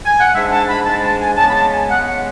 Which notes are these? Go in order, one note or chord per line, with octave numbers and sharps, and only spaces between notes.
G#5
F#5
G#2 G#3 D4 E5
A5
B5
G#2 G#3 D4 A5
A5
G#5
C#3 G#3 B3 A5
B5
A5
G#5
C#3 G#3 B3 F#5
F#5